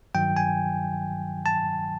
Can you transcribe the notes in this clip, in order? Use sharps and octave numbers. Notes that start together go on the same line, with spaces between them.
G2 D#3 F#3 G5
G#5
A5